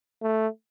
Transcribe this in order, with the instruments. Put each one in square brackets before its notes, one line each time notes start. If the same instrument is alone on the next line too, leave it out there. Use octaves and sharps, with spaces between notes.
[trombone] A3